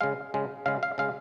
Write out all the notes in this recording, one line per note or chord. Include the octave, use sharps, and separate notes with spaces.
C#3 G#3 F5
C#3 G#3
C#3 G#3 F5
F5
C#3 G#3 F5